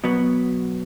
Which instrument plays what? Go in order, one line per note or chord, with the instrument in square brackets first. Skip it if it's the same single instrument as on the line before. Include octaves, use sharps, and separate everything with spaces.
[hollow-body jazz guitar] B2 F#3 B3